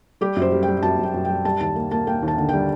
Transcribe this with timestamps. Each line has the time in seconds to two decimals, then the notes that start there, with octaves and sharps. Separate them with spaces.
0.21 G3 G4
0.36 F#2
0.42 C5
0.52 G3
0.63 G5
0.68 G3
0.83 F#2 A5
0.99 F#2 G5
1.14 F#2
1.25 G3 G5
1.45 G3 A5
1.60 D#2 A5
1.76 A#3
1.91 A#3 A5
2.07 A#3 G5
2.23 D#2
2.28 A5
2.38 D3
2.49 G3 G5